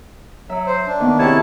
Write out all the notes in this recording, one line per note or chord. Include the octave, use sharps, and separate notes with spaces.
F#3 E5
C5
D4
D#3 A#3 B3
C3 E4 G#4 A#4 C#5 A5